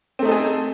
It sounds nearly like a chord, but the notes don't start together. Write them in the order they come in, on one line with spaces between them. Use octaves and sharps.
C4 A3 D#4 A4 G#4